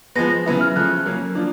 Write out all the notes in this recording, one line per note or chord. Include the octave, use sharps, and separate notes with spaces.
F3 G#3 B3 A#6
A#6
C#3 F#3 B3 E4
F6
C#3 F3 A3 F#6
F#3 A#3 C#4
F3 A#3 D4